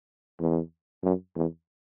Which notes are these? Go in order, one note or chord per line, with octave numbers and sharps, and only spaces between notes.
E2
F#2
E2